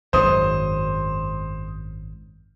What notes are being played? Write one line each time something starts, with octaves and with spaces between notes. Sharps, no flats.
G#1 F#2 F#3 C5 D#6